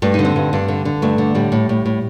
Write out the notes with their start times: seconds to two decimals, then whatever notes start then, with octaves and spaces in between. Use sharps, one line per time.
0.02 G2 A3
0.14 D3 D#4
0.25 C4
0.36 G2
0.53 G2
0.68 D3
0.85 D3
1.02 G2 A3
1.18 D3
1.35 A2 G3
1.52 A2
1.69 A2
1.86 A2